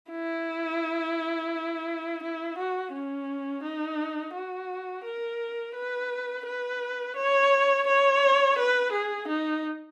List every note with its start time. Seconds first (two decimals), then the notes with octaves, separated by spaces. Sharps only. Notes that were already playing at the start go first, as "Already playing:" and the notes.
0.11 E4
2.23 E4
2.58 F#4
2.93 C#4
3.63 D#4
4.34 F#4
5.05 A#4
5.75 B4
6.46 B4
7.16 C#5
7.87 C#5
8.58 B4
8.92 G#4
9.28 D#4